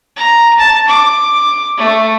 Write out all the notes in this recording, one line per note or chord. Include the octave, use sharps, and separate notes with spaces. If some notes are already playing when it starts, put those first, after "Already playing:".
A#5
A5
D6
A3